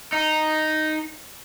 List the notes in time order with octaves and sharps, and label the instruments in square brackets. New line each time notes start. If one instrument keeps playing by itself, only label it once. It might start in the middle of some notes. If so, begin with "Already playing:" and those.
[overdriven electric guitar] D#4